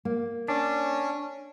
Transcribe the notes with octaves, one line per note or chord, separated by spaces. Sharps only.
A#3
C#4 D4